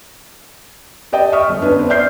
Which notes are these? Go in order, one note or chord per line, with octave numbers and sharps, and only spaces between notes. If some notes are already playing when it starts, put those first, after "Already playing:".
G4 D5 D#5 G5
D#5 E5 C#6 D#6 F6
G1
C#4 D4 B4
B3 C4
D5 E5 F6 G6 C7